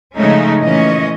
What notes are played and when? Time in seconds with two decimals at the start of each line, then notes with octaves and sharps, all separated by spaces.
0.16 C#3 F3 G#3 A3 C#4 D#4
0.61 A#2 E3 A3 C#4 D#5